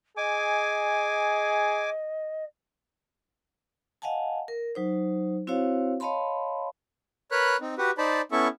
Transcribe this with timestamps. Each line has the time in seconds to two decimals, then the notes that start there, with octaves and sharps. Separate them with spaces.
0.17 G#4 D#5 G#5 D6
4.02 D#5 F5 F#5 G#5 A5
4.48 A#4
4.75 F#3 D#4 C5
5.47 C4 E4 F#4 C5 C#5 F5
6.00 C#5 D#5 F5 A5 B5 C6
7.31 A#4 B4 C#5 B5 F#6
7.61 C4 D#4
7.78 F#4 G4 B4 F#5
7.98 D#4 C5 D5 A5 B5
8.32 B3 C#4 E4 A4 E5 C#6